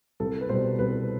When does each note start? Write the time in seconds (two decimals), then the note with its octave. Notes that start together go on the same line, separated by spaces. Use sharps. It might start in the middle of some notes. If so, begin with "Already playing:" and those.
0.20 C2 A4
0.41 B4
0.49 B2 G3 C5
0.79 C2 B4